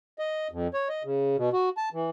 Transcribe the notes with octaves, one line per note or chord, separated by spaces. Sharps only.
D#5
F2
C#5
D#5
C#3
B2
F#4
A5
E3